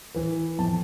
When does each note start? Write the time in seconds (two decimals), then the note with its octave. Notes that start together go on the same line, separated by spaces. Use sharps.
0.15 E3 B4
0.59 F2 A5